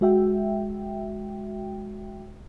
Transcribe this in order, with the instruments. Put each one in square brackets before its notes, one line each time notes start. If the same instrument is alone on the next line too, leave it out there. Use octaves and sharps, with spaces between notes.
[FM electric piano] G#3 F#4 E5 G5